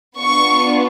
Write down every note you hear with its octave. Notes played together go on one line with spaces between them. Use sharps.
B3 D4 F4 C#6